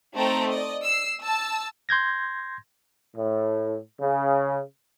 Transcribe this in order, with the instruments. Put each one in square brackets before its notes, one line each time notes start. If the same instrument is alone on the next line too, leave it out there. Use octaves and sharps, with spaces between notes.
[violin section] A3 C4 D#4 G5 A#5
D5 D#5
E6 C7
A5 E6
[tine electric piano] C6 G6 G#6 A#6
[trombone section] A2
C#3